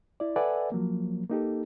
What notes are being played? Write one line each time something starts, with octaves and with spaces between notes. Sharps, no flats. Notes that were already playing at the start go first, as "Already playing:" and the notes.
E4 D5
A4 B4 D5 E5 F#5 G#5
F3 F#3 A#3
A#3 D#4 G4 A4